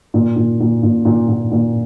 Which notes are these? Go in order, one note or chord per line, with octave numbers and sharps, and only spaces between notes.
A#2
A#2
A#2
A#2
A#2
A#2
A#2